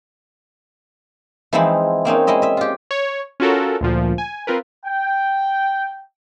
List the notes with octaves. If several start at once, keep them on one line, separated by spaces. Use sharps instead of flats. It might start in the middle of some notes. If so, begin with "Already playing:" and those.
E3 F3 G#3 C4 D#4 E4
A#3 C4 C#4 D#4
G#3 E4 D#5 E5
D#5 E5
F4 G4
C#5
C#4 F4 F#4 A4 A#4
D2 A#2 F3
G#5
C4 F4 A#4 B4
G5